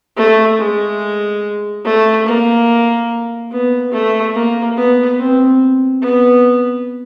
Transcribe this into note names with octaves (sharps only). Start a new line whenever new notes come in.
A3
G#3
A3
A#3
B3
A3
A#3
B3
C4
B3